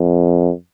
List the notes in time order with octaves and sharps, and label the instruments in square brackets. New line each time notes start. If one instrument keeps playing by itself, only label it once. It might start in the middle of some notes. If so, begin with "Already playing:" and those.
Already playing: [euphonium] F2